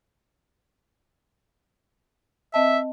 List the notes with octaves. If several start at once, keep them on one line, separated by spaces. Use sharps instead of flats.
C4 D#5 E5 A5